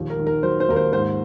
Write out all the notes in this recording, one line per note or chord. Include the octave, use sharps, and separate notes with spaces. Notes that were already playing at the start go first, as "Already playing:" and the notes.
Already playing: A#1 D#2
A#4
D#3
A#4
F#3 C5
C5
D#2 A#4
C5
G#2 C5